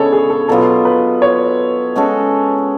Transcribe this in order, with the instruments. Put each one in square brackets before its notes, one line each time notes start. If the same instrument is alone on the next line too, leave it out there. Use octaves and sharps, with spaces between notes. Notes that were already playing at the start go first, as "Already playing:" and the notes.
Already playing: [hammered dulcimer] C#3 G#3 B3 D4 [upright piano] A4 C#5
[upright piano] G#4
A4
[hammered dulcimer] B2 F#3 B3 F4 [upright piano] A4
[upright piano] B4
C#5
[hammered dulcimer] G#3 C#4 F#4 A4